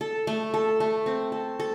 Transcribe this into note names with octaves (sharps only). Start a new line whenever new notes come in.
A4
A3
A4
A3
C4
A4
A4